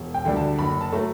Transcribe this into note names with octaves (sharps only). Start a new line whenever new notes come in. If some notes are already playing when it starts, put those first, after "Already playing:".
Already playing: E1
G5
D2 D3 G3 D4
A5
F#1 B5
A5
F#3 A3